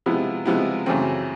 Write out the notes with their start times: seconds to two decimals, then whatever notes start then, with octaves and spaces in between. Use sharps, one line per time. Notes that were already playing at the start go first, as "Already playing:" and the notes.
0.06 C3 F3 G#3 B3 E4
0.46 C3 F3 G#3 B3 E4
0.86 F#2 C#3 E3 A3 C4